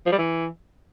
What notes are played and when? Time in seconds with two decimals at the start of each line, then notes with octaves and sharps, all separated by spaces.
0.06 F3
0.12 G3
0.18 E3